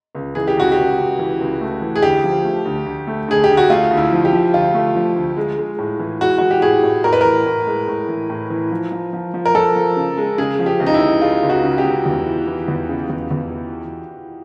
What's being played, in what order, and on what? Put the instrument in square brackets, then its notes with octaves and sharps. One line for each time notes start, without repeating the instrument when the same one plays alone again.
[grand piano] C#2
[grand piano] E3 [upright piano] G#4
[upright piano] G4
[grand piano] C#2 [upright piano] F#4
[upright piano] G4
[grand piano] C#2
C#2
E3
C#2
A3
E3
[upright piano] G#4
[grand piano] D2 [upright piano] G4
[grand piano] F3
A3
D2
D2
A3
[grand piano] D2 [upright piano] G#4
[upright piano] G4
[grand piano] D2
[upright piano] F#4
[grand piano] A3 [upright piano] F4
[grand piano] D2
[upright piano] E4
[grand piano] F3
[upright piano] G4
[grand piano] F3
[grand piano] D2 [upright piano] F4
[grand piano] A3
F3
D2
G#3
G#3
A2
E3
[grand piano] G#3 [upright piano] F#4
[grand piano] E3 [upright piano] F#4
[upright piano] G4
[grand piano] A2 [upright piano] G#4
[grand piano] A2
[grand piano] A2 [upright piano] A#4
[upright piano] B4
[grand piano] E3 [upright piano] A#4
[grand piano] A2
G#3
A2
E3
A2
E3
F3
F3
F3
F3
[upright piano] A#4
[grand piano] F3 [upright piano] A4
[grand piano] F3
C#3
G#3
[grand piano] C#3 [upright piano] G#4
[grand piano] F3
[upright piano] G4
[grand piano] C#2
[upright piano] D#4
E4
[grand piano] C#2
[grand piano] G#3 [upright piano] F4
[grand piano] C#2
[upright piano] F#4
[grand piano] C#3
[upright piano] G4
[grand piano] C#2
E2
E3
E3
E2
C#3
E2
E2
E3